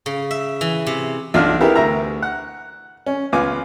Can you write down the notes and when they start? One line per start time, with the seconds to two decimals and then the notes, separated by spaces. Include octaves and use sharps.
0.06 C#3
0.31 E5
0.61 E3
0.86 C3
1.34 B1 D4 F4 F6
1.60 B3 E4 G4 G#4 A#4
1.75 D2 E5 A#5
2.22 F#5
3.06 C#4
3.33 C#2 B3 F4 G#5 D6